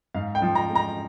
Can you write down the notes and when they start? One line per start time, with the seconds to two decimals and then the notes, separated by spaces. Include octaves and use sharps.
0.14 G#2 F5
0.35 G5
0.42 F3
0.55 A#5
0.69 G#3
0.75 A#5